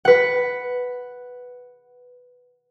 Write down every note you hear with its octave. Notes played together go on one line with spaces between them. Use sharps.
B4 F#5